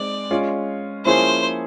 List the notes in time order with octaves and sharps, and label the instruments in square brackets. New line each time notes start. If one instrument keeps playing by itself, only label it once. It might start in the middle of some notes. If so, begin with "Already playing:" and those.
Already playing: [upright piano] G#3 C4 D#4 [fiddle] D5
[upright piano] G#3 C#4 F4
[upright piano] F3 A#3 C#4 E4 G#4 [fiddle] C5